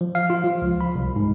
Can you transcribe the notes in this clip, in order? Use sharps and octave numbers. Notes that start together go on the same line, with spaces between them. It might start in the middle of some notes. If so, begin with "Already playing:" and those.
F3
F5
F4
F3
C#2
B5
C2
G#2